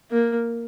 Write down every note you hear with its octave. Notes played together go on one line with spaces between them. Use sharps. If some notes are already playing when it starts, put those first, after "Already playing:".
A#3